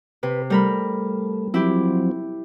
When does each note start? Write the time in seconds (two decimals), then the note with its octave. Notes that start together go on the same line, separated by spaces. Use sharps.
0.23 C3 B4
0.50 G3 A3 A#4 B5
1.54 F3 F#3 C4 E4 G4